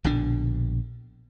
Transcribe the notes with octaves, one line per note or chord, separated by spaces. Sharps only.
A#1 B2 D3 D4